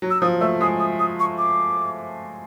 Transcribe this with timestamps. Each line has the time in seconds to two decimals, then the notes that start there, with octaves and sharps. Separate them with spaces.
0.02 F#3
0.10 E6
0.21 F3 D#6
0.41 A3 E6
0.61 G#3 D#6
0.80 D#6
1.00 D#6
1.20 C#6
1.38 D6